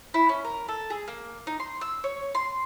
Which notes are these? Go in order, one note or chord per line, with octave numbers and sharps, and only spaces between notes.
E4
C#4
A#4
A4
G#4
A#3
D#4
C6
E6
C#5
C6